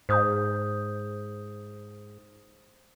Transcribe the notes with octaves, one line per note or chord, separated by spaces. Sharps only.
G#2 C5 D#6 G6